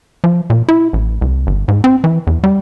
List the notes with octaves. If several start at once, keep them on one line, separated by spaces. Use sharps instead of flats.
F3
A#2
E4
A1
C2
G1
G#2
C4
E3
E2
G3